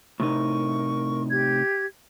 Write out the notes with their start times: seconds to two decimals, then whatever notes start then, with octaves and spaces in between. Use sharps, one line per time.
0.20 A2 C3 D#4 A#4 C#6
1.30 G4 G#6